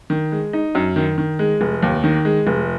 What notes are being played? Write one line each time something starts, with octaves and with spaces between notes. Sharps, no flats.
D#3
G#3
D#4
F#2
D#3
D#3
G#3
F1
D#2
D#3
G#3
F1